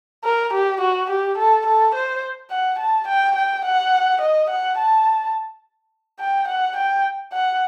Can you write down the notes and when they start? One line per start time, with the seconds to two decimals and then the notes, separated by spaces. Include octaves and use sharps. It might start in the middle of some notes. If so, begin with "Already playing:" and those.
0.24 A#4
0.53 G4
0.81 F#4
1.10 G4
1.38 A4
1.66 A4
1.95 C5
2.51 F#5
2.79 A5
3.08 G5
3.36 G5
3.65 F#5
4.21 D#5
4.50 F#5
4.78 A5
6.20 G5
6.48 F#5
6.77 G5
7.33 F#5